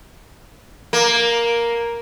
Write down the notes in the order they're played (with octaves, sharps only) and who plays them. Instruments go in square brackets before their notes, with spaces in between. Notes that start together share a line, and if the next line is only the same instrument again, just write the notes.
[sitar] A#3